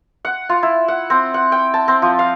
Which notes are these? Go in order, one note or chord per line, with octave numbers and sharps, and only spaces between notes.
F#5
F4
E4
F#5
C4
F#5
G5
A5
C4
F3
F5